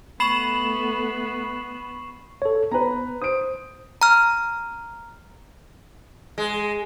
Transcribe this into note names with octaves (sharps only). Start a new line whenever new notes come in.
A3 B3 B5 C#6 C7 E7 F#7
A4 C#5
B3 B4 A#5
C5 D#6 D7
A#5 F6
G#3